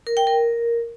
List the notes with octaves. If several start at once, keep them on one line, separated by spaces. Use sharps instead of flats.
A#4
G5
A#4